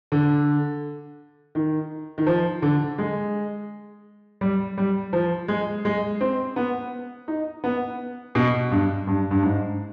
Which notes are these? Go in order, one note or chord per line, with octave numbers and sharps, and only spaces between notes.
D3
D#3
D#3
F3
D3
G#3
G3
G3
F3
G#3
G#3
C4
B3
D#4
B3
B2
G2
G2
G2
G#2